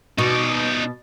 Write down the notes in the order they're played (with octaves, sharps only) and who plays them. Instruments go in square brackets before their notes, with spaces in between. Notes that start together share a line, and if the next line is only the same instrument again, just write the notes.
[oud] B2 [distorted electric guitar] D#4 D5